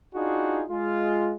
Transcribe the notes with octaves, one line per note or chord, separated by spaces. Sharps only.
D4 D#4 F4 F#4 G#4
G#3 F4